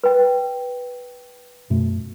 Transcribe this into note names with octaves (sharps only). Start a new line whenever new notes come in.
B4 G5
F#2 B2 A3